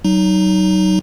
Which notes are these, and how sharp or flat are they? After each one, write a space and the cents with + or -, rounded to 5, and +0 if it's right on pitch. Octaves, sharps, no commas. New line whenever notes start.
F#3 +35 D#4 -5